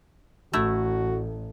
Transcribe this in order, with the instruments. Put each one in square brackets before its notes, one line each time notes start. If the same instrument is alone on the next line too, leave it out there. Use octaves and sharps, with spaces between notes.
[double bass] A1 [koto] A3 E4 [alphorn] F#4